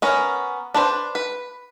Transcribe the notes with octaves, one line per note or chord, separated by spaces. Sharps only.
B3 C#4 A#4
D4 B4 C5
B4